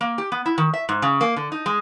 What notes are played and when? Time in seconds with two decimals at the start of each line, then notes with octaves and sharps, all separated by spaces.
0.01 A#3
0.18 G4
0.32 B3
0.46 E4
0.58 D#3
0.74 E5
0.89 G#2
1.02 C#3
1.21 A#3
1.36 D3
1.52 D#4
1.66 G#3